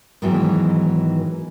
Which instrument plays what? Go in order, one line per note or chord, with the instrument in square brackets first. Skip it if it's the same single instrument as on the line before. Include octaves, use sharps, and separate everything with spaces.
[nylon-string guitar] G#2 D#3 E3 F#3 B3